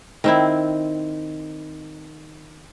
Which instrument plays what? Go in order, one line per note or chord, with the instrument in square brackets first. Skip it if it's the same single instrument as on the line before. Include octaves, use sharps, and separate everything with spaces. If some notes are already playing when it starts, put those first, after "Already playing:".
[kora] D#3 C4 E4